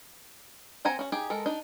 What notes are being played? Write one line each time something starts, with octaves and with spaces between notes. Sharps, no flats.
C4 F#5 G#5 A#5
C#4 F#4
D#4 G4 G#4
G#3 A4 A#4
D4 D#4